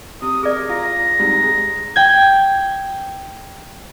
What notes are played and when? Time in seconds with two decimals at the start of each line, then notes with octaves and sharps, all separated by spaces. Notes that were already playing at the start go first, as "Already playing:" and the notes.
0.22 C3 D#6
0.43 G#4 A#4 D5
0.69 F4 A#5
1.19 G#2 C3 G3
1.43 G#3
1.96 G5 G#6